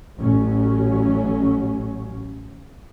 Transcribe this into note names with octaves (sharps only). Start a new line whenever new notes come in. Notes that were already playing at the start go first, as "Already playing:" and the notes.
A1 A2 F#3 C#4